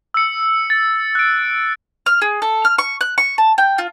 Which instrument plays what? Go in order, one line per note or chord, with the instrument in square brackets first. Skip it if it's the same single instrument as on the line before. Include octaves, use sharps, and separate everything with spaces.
[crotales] E6 C#7
A6
F#6 D7
[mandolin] F6
G#4
A4
F6
C#6
F#6
C#6
A5
G5
F4